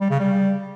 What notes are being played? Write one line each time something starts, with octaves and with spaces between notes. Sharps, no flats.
G3
C#3
G3